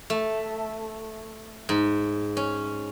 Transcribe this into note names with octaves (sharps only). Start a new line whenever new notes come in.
A3
G#2
C#4